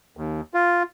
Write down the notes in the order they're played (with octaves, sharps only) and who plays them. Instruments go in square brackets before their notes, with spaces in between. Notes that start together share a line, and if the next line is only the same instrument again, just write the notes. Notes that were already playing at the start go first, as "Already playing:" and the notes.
[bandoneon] D#2
F4